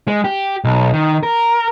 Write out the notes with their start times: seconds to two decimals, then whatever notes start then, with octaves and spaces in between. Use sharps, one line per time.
0.08 G#3
0.24 G4
0.64 B1
0.94 D#3
1.23 A#4